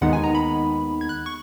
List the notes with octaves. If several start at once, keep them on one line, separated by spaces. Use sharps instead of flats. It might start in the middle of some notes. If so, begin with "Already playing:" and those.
D#2 D#3 G#3 B3 D#4 F#5
G#5
A#5
B5
G#6
F#6
C#6